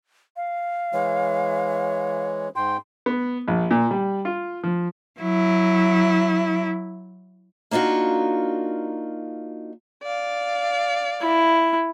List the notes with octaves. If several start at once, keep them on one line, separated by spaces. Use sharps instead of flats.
F5
E3 G#3 C#5
G#2 G5 C6
B3
A#1
A#2
G3
F4
F3
F#3 E4
A#3 D4 D#4 F4 F#4
D5 F5
E4